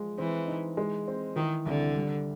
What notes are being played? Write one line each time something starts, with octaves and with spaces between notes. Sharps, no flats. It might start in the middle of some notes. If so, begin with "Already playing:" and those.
Already playing: F3 G#3
E3 C4
D#4
G#3
C4
D#3 E3
C2 D3
G3